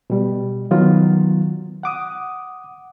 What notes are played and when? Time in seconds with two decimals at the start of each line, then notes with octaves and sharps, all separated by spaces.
0.10 B2 G3
0.71 D#3 F#3 B3 F4 F#4
1.83 F#5 D6 D#6